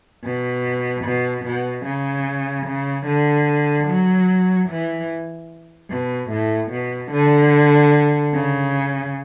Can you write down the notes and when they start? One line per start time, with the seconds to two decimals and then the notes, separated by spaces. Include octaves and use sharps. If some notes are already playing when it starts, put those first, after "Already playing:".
0.24 B2
1.05 B2
1.45 B2
1.86 C#3
2.67 C#3
3.07 D3
3.88 F#3
4.70 E3
5.90 B2
6.31 A2
6.71 B2
7.12 D3
8.34 C#3